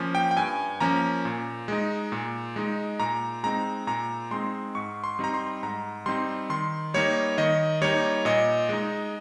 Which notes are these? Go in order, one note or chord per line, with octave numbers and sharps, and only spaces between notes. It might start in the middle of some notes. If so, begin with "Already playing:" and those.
Already playing: F3 A#3 C#4
G5
G5
G2 G#5
F3 A#3 C#4 A#5
A#2
G#3 D#4
A#2
G#3 D#4
A#2 A#5
G#3 C4 D#4 A#5
A#2 A#5
G#3 C4 D#4 C6
G#2 C#6
C6
G3 C4 D#4 A#5
C6
G#2 A#5
G3 C4 D#4 C6
D#3 C6
G3 A#3 D#4 C#5
D#3 D#5
G3 A#3 D#4 C#5
A#2 D#5
G#3 D#4